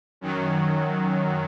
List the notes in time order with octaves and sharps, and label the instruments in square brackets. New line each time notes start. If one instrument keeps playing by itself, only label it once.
[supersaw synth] F#2 D#3 F#3